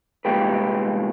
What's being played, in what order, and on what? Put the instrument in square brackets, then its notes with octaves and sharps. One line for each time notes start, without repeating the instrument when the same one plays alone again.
[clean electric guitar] C2 F2 A#2 G#3 G4 B4